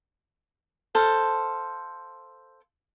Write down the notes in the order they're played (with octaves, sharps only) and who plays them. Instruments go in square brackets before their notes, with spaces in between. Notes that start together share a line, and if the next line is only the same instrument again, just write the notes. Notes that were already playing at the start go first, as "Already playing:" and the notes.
[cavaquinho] A4 C5 F5